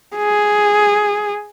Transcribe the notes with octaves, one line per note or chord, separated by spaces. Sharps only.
G#4